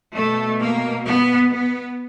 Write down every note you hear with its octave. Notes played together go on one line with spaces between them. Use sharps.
B2 A3
A#3
B3
B3